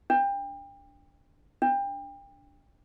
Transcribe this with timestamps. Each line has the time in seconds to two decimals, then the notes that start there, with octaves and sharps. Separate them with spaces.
0.10 D4
1.62 D4